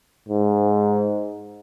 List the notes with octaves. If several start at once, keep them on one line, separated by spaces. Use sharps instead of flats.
G#2